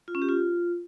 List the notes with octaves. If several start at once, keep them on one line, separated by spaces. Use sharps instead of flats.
F4
C#4
G4
F4